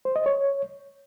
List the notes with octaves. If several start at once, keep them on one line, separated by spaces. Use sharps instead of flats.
C5
D#5
C#5